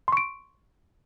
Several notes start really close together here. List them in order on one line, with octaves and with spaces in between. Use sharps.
C6 C#6 D7